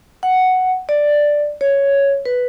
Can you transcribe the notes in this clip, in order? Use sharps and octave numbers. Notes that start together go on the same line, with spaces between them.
F#5
D5
C#5
B4